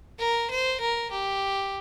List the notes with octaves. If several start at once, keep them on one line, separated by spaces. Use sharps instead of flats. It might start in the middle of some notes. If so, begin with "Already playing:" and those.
A#4
C5
A#4
G4